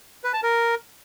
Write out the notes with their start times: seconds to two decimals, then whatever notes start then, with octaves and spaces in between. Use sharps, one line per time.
0.24 B4
0.33 A5
0.43 A#4